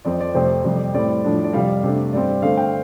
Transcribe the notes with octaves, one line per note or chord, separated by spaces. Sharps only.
F2 F3 C4 D5
D5
F2 C3 A3 C4 C5
F2 C3 G3
A2 G3 C4 D5
A2 F3 D4
D5
F2 C3 G3 F5
C3 A3 D4
G2 G3 C4 D5
D3 A3 C4 F5
G5